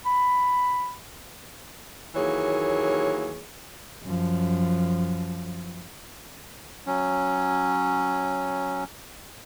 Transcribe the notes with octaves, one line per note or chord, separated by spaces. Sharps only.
B5
D#2 E3 F#3 A#3 G#4 C#5
F#2 F3
F#3 C#4